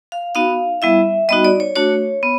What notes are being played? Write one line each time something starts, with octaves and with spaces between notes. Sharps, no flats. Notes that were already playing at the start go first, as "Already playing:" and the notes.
F5
B3 D#4 F#4 F5
G3 B3 E4 E5
G3 B3 D#4 F#4 D#5
D5
C#5
A3 D4 F#4 C#5
B3